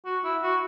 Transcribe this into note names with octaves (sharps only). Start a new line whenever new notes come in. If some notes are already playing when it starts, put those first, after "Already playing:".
F#4
E4
F#4